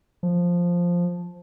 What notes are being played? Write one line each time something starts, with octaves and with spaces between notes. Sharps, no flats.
F3